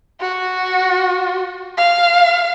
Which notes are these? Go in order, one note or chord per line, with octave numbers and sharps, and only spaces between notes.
F#4
F5